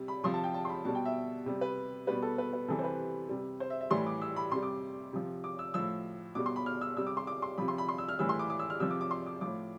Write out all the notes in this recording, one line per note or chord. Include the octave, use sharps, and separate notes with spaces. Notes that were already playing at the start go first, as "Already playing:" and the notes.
Already playing: C3 G3
B5
C3 F3 C6
A5
G5
A5
C6
B5
B2 G3 A5
G5
E5
C3 G3
B4
B2 G3 B4
A4
B4
B4
C3 E3 G3 A4
C5
B4
C3 G3
C5
E5
E5
A2 E3 G3 C6
D6
E6
B5
C3 G3 C6
D6
C3 F3
D6
E6
A2 F3 E6
B2 G3 D6
C6
B5
F6
E6
C3 G3 E6
D6
C6
D6
C6
C3 F3 B5
C6
B5
C6
E6
F6
A2 E3 G3 E6
C6
D6
D6
E6
F6
C3 F3 E6
D6
D6
C6
D6
A2 F3 D6